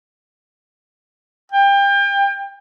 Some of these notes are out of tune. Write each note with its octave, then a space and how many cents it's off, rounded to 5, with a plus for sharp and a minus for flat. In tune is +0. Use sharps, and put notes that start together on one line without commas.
G5 +30